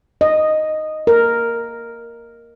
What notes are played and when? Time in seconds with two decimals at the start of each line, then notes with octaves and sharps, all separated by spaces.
0.21 D#5
1.07 A#4